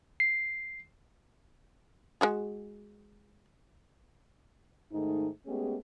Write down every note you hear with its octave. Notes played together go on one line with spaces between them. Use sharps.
C7
G#3 F#4 G#4
G#2 D#3 A3 D#4
G#3 A3 B3 C#4 G4 G#4